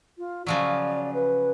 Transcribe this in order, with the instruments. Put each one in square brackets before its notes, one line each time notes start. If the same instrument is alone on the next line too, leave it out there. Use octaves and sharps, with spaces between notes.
[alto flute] F4
[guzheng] C#3 F3 F#3 [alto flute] D5
[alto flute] B4